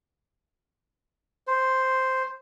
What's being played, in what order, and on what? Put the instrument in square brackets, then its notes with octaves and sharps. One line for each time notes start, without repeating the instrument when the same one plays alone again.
[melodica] C5